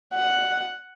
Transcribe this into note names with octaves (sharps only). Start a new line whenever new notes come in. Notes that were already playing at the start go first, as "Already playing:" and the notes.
F#5